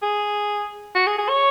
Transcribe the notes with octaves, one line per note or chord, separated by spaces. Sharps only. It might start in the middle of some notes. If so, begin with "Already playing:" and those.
G#4
F#4
G#4
G#4
C#5